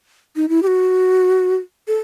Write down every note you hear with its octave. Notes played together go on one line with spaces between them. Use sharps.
D#4
E4
G4
F#4
A4